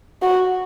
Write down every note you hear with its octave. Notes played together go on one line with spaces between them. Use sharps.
F#4